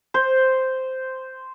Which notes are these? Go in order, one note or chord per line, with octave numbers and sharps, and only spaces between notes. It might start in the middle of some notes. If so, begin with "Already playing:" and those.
C5